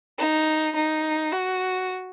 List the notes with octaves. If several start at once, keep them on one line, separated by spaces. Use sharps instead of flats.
D#4
D#4
F#4